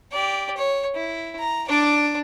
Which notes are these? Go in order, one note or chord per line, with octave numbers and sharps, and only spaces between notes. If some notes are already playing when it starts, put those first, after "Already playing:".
G4 D5
C#5
E4
A#5
D4 D5